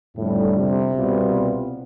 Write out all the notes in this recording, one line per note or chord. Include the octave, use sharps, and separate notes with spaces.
G1 F2 A2 D3 G3
C3
C2 B2 G3 B3 F4